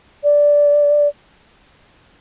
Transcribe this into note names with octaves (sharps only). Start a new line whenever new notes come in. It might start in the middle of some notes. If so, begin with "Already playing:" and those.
D5